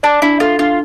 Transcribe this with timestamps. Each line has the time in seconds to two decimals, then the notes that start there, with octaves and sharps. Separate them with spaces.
0.03 D4 D5
0.22 D4 E4
0.40 F4 A4
0.59 D4 F4